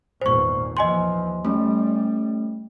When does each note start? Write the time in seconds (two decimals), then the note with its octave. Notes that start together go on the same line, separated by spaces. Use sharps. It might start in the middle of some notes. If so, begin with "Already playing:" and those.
0.21 G#1 E2 A#2 C5 C#6
0.77 D#2 E3 F3 D#5 G#5 C6
1.45 G3 A3 C#4